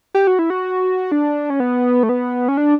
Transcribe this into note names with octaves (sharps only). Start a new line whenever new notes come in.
G4
F#4
E4
F#4
D4
C#4
B3
A3
B3
C#4
D4